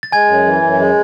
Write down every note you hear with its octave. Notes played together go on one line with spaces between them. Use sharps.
A6
G#3 G#5 G#6
F#2
E3
F#2
G#3